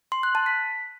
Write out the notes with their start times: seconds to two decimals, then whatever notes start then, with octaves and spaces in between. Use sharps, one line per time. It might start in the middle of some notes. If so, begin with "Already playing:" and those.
0.12 C6
0.23 F#6
0.35 A5
0.46 B6